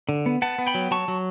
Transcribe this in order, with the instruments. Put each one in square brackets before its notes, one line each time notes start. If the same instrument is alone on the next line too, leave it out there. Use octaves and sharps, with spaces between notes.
[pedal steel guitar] D3
B3
B3 F#5 A5
B3
G5 B5
F#3
F#3 A5 C#6
F#3